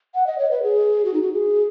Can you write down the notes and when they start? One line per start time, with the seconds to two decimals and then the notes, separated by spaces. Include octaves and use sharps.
0.15 F#5
0.27 D#5
0.39 C#5
0.51 B4
0.63 G#4
1.05 F#4
1.14 D#4
1.22 F#4
1.33 G#4